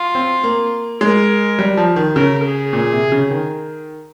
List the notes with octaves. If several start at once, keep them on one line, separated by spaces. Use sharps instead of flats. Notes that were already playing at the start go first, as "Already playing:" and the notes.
Already playing: F4
C4
A#3
G#3 A#4
G3
F3
D#3
C#3 A#4
G#4
A#2
C3
C#3
D#3